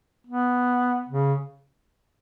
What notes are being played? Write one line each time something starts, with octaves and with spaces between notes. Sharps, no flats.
B3
C#3